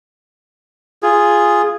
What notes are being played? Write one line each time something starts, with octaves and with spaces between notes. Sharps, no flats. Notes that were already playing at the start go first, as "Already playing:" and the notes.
F4 G#4